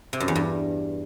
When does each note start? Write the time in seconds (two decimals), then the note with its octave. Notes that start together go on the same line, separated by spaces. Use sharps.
0.13 C3
0.20 F#2
0.28 E2
0.35 G2